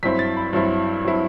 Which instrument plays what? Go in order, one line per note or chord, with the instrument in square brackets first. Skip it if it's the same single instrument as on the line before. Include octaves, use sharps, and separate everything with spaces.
[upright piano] G2 F#3 C4 E4 B6
A6
B5
G2 F#3 C4 E4
F#3 C4 E4